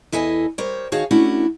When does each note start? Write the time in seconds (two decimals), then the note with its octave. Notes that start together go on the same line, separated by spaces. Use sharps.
0.12 E2 E4 A4 D#5 G#5
0.58 G3 A#4 C5 C#5
0.92 D#3 F#4 G#4 C#5 F5 A5
1.11 A3 C#4 D4 E4 F#4